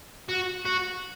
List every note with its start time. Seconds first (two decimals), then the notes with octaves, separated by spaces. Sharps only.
0.29 F#4
0.65 F#4